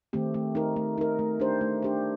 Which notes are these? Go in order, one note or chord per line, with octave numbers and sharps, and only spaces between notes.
D#3 A3 C4 G4
A3
D#4 A#4
A3
D#4 A#4
A3
D4 G4 C5
A3
D4 G4 C5